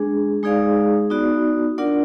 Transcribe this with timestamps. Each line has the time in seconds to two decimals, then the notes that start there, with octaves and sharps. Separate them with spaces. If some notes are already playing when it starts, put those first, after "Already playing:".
Already playing: G#3 D4 G#4
0.43 G#3 D#4 G#4 D5 F5
1.10 B3 D#4 F#4 D5
1.78 D4 F4 A#4 D5 F#5